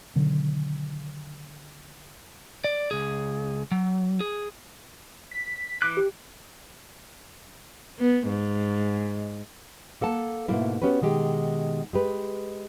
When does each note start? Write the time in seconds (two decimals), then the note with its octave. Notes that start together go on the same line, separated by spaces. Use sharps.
0.15 B2 D3 D#3 F#3
2.64 D5
2.91 C#2 G#4
3.72 F#3
4.20 G#4
5.31 B6
5.82 E3 D6 F#6
5.97 G4
7.99 B3
8.28 G#2
10.01 A#3 A4 F#5 A5
10.48 G#2 B2 A3 A#3 E4
10.82 B3 C#4 F#4 G4 B4
11.02 B2 D#3 G#3 G4
11.93 G#3 G4 B4